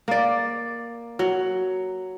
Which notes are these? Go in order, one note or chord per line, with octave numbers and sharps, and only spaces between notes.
A#3 D5
F#3